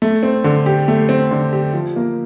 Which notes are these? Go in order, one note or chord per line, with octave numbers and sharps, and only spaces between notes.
A3
C4
D3
G4
A3
C4
D3
G4
F3
A#3